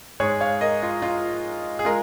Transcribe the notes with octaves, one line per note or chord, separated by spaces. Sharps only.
G#2 G#3 G#4 C#5
C#5 F5
A#4 D#5
F4
F4
G#4
G#3 F4 A#4